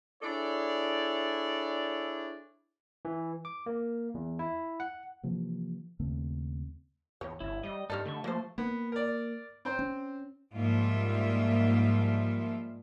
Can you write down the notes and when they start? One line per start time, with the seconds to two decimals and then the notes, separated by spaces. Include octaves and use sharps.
0.22 D4 E4 G#4 A4 C#5 D5
3.05 E3
3.45 D6
3.66 A#3
4.14 E2
4.39 E4
4.80 F#5
5.23 C3 E3 F3 A#3
5.99 D#2 C#3 A3 C4
7.21 E2 C#5
7.40 G1 E4
7.63 G3 D#5
7.90 G2 D#3 G3 D#4 A4 F6
8.05 D3 A3 A4 C#6
8.24 F3 A#3 C5
8.58 A#3 B3
8.92 A#4 D5
9.65 C4 C5
9.79 C#4
10.53 G#2 F3 G3 A#3 F4 E5